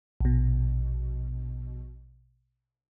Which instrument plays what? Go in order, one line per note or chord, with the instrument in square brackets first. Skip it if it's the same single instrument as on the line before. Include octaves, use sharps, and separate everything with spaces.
[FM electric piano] A#1 B2